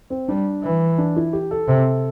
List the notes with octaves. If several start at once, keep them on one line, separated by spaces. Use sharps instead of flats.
C4
G3 D4
E3
D4
E4
G4
A4
C3